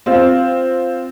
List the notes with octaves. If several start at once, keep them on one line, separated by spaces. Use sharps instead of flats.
C4 F4